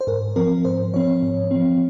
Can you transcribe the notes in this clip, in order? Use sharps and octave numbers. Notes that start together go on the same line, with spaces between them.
C5
G#2 A#4
F3 C4 A#4
G#2 C5
F3 C4 C#5
G#2
F3 C4